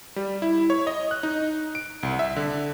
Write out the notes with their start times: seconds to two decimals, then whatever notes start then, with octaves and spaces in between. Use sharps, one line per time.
0.16 G3
0.42 E4
0.70 C#5
0.87 D#5
1.11 F#6
1.23 D#4
1.75 D7
2.03 C2
2.19 E5
2.36 D3